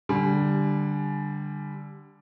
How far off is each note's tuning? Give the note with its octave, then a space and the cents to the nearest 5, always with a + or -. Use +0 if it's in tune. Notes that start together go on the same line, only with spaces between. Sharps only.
D3 +0 G3 +0 G#5 +30